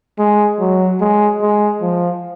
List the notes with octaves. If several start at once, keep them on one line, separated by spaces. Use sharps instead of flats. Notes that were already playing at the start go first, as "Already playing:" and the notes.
G#3
F#3
G#3
G#3
F3